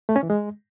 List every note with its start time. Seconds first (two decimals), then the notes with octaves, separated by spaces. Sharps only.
0.09 A3
0.16 C#4
0.23 E3
0.30 G#3